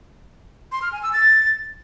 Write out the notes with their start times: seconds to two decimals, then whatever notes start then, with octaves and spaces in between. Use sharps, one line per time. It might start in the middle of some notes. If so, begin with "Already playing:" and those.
0.72 C6
0.82 F6
0.92 G#5
1.03 E6
1.13 A6